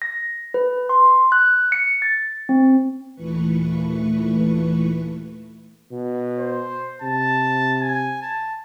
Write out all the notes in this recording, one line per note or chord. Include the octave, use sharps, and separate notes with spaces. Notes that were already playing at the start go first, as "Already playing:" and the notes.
A#6
B4
C6
F#6
C#7
A6
C4
D#2 A#2 E3 A3 B4 C#6
B2
C5
C3 A5
G#5
A5